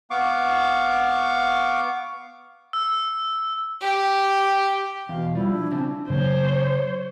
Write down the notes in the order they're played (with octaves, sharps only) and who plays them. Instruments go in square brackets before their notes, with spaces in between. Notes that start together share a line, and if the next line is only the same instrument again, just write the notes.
[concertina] B3 F5 C#6 D6
[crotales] E6
[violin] G4
[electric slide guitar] E2 [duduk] B2 [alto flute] F5
[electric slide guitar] F3 [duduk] G3 [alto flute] E4
[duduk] D4
[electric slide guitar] C#3 C4 [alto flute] A5
[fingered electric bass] C#3 F#3 A#3 [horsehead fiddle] C5 C#5